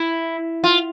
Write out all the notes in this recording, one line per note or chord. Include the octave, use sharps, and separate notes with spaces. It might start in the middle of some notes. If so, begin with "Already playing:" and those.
Already playing: E4
F4